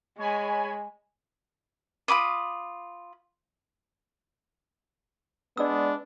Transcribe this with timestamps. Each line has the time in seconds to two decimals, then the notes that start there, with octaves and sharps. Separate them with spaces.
0.18 G#3 C#5 G#5 B5
2.08 F4 B5 D6 D#6
5.57 G#3 B3 D4 D5 E6